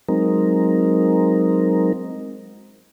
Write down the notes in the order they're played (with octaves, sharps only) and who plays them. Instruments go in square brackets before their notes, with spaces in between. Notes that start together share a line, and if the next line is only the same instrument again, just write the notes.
[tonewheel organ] F#3 G#3 C4 D#4 A#4